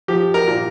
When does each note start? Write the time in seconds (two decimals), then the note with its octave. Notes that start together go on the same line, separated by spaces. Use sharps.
0.08 F3 G4
0.34 A#4
0.47 A#2